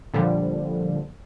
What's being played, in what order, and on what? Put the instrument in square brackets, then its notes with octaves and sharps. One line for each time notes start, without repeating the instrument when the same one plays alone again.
[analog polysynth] A#2 D3 F3 G3